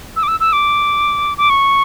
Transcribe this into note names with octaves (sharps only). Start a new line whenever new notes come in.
E6
D6
E6
E6
D6
D6
C#6